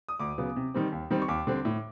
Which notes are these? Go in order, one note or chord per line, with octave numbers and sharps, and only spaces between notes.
D#6
D2 D6
C#3 F#3 B3
C3
D#3 G3 C4
D#2
D#3 G3 C4
C#6
D#2 D6
D3 G3 C4
A2